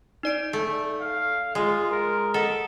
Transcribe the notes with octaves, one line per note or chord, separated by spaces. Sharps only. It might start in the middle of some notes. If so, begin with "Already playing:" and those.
D#4 D5 D7
A3
F5
G#3 F4
A#4
A4 D#5 F#5